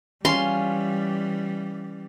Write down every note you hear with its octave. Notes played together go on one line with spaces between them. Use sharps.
E3 G3 C#4 F4 C6